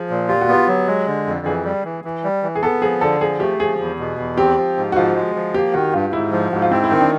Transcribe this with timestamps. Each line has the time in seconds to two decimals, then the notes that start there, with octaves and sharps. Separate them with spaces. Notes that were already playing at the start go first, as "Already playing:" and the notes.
Already playing: F3 G#4
0.10 A#2
0.28 F4 G4
0.41 F#4
0.48 B3 G4
0.67 F#3
0.87 G#3
1.07 D3
1.27 F2
1.46 E3 G#4
1.65 G3
1.85 E3
2.04 E3
2.24 G3
2.43 E3
2.55 G#4
2.62 B3 A4
2.82 F3 G#4
3.01 D3 A4
3.21 F3 G#4
3.40 A3 G4
3.59 F3 G#4
3.79 E2
3.99 B2
4.19 E2
4.37 C4 G4
4.57 F3
4.77 G#2
4.92 F#4
4.96 F3 F4
5.16 G#3
5.35 F3
5.54 A#3 G4
5.74 D#3 F#4
5.94 G2 F4
6.13 G#2 E4
6.32 F3
6.52 G#2 F#4
6.62 F4
6.71 C4 E4
6.84 E4
6.90 D#3 D#4
7.01 D4